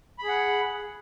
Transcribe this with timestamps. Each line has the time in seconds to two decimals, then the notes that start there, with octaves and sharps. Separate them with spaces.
0.19 B5
0.23 G#4
0.28 F#5